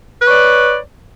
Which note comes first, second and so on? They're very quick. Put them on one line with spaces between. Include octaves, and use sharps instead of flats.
B4 C#5 D5